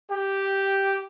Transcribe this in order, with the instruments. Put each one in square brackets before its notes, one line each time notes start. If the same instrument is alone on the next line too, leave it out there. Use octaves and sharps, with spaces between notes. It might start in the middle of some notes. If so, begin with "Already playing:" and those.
[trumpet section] G4